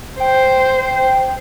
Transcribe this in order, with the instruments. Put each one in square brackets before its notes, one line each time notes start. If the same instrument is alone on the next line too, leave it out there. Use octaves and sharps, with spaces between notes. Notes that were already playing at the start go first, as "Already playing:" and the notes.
[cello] C5 [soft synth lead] G5